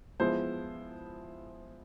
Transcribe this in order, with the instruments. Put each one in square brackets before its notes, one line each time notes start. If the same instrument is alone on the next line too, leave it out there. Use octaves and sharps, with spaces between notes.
[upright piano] F3 G#3 B3 E4 C5